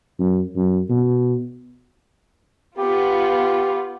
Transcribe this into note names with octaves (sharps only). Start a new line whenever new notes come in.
F#2
F#2
B2
B3 F4 G4